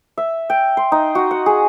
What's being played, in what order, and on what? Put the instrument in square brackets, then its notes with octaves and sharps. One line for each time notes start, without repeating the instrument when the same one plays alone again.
[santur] E5
G5
C6
D#4
F#4
F#5
G#4